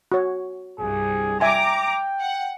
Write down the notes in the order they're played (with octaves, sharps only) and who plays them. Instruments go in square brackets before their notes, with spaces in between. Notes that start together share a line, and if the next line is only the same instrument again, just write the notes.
[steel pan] F#4 C#5
[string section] C2 G2 [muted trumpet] G#4
[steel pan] E5 G#5 C6 [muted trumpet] G5 [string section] A#5 D6
[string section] F#5